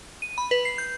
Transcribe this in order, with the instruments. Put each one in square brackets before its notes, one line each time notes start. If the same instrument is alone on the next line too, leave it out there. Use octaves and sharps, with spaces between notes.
[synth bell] D#7
B5
B4
C7
G6